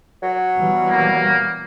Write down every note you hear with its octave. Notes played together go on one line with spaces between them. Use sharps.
F#3
B2 E3 G3
A#3